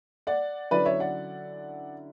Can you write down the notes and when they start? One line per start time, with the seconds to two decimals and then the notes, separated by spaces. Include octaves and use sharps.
0.27 D5 F#5
0.71 D3 F#3 C#4 E4 B4 D5
0.85 C#5 E5
1.00 D5 F#5